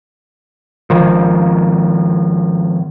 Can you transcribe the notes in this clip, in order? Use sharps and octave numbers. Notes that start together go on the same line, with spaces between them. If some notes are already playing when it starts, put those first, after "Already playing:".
G#1 D#3 F3